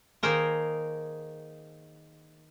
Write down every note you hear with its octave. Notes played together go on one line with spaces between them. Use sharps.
D#3 A#3 D#4 G#4 A#4 C5